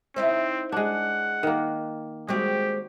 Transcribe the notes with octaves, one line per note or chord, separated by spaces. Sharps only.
C4 D#4 E4 C5
G#3 D4 F#5
D#3 A#3
G3 G#3 C4 F#4 G4